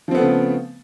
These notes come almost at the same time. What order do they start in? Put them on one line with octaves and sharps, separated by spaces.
F3 C4 B3 A3 C#3